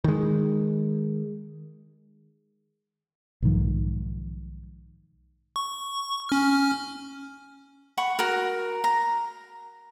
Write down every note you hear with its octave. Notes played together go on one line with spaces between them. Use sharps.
D#3 G#3
B1 G#2 D#3 F3
C#6
C#4 F6
F#5 B5 C#6
F#4 A#4
A#5